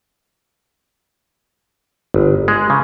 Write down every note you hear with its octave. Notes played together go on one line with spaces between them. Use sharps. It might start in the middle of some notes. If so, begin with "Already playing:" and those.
G1
G#3
C#3